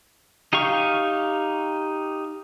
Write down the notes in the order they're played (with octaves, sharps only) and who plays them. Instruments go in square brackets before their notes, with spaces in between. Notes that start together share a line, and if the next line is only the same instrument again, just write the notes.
[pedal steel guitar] D#4 G4 F5 C#6